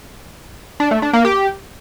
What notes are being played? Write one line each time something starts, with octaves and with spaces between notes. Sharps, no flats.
D4
A3
D4
A#3
G4